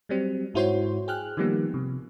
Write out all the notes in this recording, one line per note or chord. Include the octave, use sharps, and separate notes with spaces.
F#3 G3 C4
G#2 E4 F#4 C5 C#5 C6
G#4 G5 F6 F#6
D#3 F3 G3 A#3 B3
C3